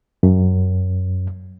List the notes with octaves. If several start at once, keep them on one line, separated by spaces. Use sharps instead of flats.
F#2